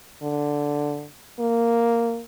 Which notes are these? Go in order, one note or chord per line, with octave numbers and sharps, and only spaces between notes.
D3
A#3